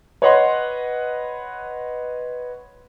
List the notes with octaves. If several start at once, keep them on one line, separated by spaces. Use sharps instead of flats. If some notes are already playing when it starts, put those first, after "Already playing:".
B4 C#5 D#5 F#5 C6